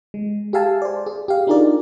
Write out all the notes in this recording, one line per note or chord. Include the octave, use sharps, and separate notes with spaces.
G#3
G4 G#4 E5 F5 G#5 A5
C5 D5
G#4
G4 F5
D4 D#4 F4 G#4 A#4 D5